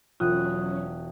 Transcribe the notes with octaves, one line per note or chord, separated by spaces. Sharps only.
E1 F#3 C#4 F4 D#6 F#6